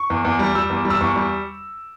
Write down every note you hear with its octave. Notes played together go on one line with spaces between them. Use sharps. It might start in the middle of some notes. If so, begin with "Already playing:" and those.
Already playing: C#6
E2
E2
G3
G3 E6
E2
G3
E6
E2 C#6
G3